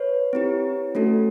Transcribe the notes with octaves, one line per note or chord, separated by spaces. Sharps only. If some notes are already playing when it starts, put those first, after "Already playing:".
Already playing: B4 C#5
C4 E4 G4
A3 C#4 F#4 A4